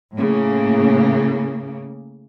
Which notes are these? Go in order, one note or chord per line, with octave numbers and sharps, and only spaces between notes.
A2 C#3 A#3